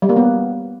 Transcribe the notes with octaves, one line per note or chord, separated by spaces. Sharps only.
G3
A#3
B3